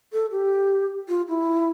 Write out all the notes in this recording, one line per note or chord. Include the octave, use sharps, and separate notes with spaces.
A4
G4
F4
E4